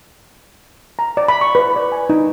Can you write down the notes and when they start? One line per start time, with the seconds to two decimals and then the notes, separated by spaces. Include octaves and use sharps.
0.99 A#5
1.17 D5
1.28 B5
1.41 C#6
1.55 B4
1.76 D5
1.92 G#5
2.10 D#4